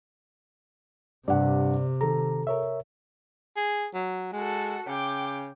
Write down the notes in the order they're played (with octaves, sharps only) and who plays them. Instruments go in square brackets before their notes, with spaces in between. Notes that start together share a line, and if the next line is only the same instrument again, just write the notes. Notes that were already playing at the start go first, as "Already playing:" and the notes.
[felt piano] G2 F#5 [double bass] C3 [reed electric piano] D5
[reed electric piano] D#3 A#5 [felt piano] A4
[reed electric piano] A#4 C#5 E5
[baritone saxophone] G#4
F#3
[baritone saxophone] G#3 [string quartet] F#4 A4
[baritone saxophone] C#3 [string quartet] G5 D6